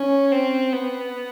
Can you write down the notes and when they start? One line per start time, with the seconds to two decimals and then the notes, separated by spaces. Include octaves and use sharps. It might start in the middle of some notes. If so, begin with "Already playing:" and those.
Already playing: C#4
0.32 C4
0.72 B3